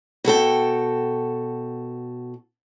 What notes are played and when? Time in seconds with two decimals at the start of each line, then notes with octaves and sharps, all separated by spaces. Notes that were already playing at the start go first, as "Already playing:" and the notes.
0.25 B2 F#4 A4 G5